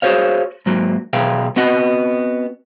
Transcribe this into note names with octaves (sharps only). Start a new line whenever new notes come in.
F#4 G#4 C5 C#5 F5
G#2 F#3 A#3
B1 B2 G#4 F5 G5
B3 C4 F#4 D#5 F#5